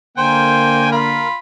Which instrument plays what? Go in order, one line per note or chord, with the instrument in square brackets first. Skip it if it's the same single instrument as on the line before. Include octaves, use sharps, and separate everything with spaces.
[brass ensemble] D3 A#3 [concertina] C5 [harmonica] G5 G#5
[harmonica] F4 B5 [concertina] A#4